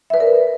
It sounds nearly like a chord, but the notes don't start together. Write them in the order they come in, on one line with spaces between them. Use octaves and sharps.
E5 B4 D5 A#4